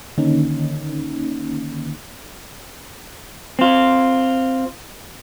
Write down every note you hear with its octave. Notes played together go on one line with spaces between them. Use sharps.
D3 D#3 A#3 C#4 D#4
C4 F4